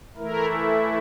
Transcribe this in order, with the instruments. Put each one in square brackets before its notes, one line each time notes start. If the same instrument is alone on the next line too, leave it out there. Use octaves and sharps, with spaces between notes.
[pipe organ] E3 A3 E4 A#4